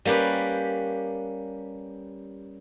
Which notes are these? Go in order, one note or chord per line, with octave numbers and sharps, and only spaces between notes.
G3 A#3 C#4 G4 B4